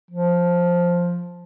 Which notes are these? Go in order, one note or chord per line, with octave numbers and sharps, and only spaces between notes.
F3